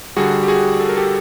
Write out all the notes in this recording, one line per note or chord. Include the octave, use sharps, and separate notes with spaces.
D3 G3 F#4 G#4
G4
F#4 G#4
A4
A#4
G4 A4